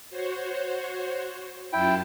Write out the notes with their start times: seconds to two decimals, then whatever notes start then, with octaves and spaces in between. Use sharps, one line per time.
0.10 F#4 C5 C#5
1.73 F#2 E4 F4 G5 A5